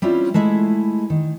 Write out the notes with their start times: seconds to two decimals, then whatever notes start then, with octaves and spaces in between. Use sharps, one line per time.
0.02 G3 C4 C#4 E4 F4
0.34 G#3 A3 E4 G#4
1.10 D#3